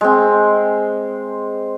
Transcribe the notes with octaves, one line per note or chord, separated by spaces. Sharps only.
G#3 C4